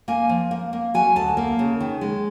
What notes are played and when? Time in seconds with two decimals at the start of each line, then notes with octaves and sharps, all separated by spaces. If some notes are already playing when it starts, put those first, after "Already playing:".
0.08 A#3 G#5
0.29 F3
0.51 A#3
0.73 A#3
0.94 F#3 G#5
1.16 D2 A5
1.37 A#3
1.59 C#3
1.80 D#3
2.01 G#3